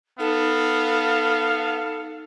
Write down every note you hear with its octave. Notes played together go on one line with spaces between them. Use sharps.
B3 D#4 A4 F5